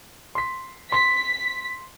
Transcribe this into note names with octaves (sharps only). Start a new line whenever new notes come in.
C6 B6
C6 B6